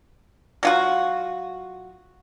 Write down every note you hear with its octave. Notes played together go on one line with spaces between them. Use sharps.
F#3 F4 F#4